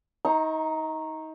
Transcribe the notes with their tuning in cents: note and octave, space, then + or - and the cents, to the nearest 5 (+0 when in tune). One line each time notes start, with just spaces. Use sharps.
D#4 +30 A#5 +0 C#6 -30